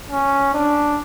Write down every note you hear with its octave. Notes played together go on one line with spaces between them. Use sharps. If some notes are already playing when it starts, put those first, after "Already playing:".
C#4
D4